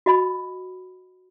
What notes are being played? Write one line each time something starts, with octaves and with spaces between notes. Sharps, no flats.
F#4 D#5 B5